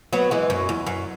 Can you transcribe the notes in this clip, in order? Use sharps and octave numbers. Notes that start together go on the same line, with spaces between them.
F#3 B3
E3 G#3
F#2
E2
F#2